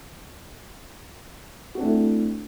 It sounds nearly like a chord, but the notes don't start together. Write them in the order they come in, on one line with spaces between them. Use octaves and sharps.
F#4 C4 D4 A3 E4